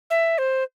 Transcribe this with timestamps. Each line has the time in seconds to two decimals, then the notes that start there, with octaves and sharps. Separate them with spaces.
0.10 E5
0.38 C5